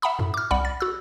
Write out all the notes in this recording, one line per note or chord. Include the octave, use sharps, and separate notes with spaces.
E5 F#5 A#5 B5 D#6
F#2 A2
D6 F6
C2 D5 F#5 B5
A6
F#4 E6